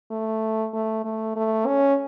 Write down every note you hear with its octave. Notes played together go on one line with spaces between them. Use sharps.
A3
A3
A3
A3
C#4